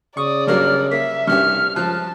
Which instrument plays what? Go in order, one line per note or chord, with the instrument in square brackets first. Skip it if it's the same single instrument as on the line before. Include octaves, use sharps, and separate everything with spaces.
[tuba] C#3 [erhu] D5 [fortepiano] C#6 [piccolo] D#6
[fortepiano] G2 F#3 A#3 [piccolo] F6
[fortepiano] A#3 [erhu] E5 [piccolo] B6
[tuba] C2 [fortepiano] G2 C#4 G4 [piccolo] F6
[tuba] C#2 [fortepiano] F3 [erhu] A5 [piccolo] F#6